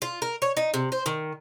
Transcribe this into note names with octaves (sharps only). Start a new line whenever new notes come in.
F4
A#4
C#5
D#4
C3
C5
D#3